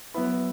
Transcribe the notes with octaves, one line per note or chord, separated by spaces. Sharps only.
F#3 B3 E4 B4